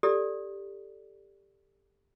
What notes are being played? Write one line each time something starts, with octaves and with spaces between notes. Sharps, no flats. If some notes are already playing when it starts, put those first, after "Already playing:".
G4 A4 D5